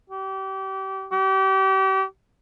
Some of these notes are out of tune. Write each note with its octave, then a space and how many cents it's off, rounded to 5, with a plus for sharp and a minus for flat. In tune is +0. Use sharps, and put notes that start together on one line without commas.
G4 -30
G4 -35